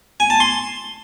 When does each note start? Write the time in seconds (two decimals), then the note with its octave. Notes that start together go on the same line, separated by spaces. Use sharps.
0.20 G#5
0.30 A5
0.40 C6